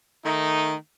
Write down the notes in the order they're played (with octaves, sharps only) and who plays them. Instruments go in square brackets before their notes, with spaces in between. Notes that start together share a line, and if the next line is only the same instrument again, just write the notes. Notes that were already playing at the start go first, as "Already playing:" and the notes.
[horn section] D#3 A3 D#4